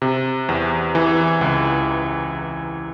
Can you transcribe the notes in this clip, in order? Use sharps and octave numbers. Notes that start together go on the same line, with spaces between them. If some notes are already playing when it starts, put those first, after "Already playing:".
C3
E2
E3
C#2